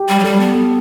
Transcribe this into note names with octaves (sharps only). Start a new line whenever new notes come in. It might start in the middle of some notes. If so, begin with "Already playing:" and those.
Already playing: G4
G3
F#3
G3 A4
B3
A4